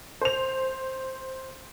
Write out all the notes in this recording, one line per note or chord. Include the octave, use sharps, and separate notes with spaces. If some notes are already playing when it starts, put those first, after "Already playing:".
C5 F7